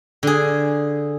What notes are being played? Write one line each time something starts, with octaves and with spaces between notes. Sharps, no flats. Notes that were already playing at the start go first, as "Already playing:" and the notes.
D3 G#4